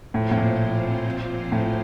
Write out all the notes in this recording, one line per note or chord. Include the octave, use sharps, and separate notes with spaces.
A2 F3 C4 F4 C5
A2
A#2
A2